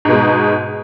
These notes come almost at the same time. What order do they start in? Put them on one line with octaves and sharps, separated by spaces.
G#2 B2 G#3